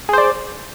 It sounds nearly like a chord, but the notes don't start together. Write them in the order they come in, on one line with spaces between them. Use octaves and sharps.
G#4 C5 D5